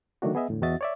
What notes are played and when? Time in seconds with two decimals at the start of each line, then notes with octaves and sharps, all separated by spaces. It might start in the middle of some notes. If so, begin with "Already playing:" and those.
0.22 D3 D#3 F#3 A3 D4 F#4
0.35 B3 G#4 D#5 E5
0.49 E2 A2 D3
0.62 E2 F#4 D#5 E5 A6
0.81 C#5 D5 E5